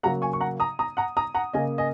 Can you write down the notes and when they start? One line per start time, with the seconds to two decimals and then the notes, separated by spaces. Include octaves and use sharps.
0.03 C#3 F#3 A#3 F#5 A#5
0.22 G#5 C#6
0.33 C#6
0.41 F#5 A#5
0.60 A#5 D#6
0.79 A#5 D#6
0.97 F#5 A#5
1.17 A#5 D#6
1.35 F#5 A#5
1.53 C#3 A#3 D#5 G#5
1.78 D#5 G#5